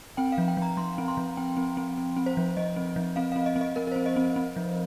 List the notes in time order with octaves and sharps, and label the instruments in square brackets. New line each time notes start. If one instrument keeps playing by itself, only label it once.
[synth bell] C4 G5
F5
F3
G5
F3 A#5
F3 C6
C4
C6
F3
C4 G5
C4
C4
C4
C4
C5
F3
F3 D#5
C4
F3
C4 F5
C4 F5
D#5
C4
D#5
C4 A#4
A#4
C4 C5
D#5
C4
C4
F3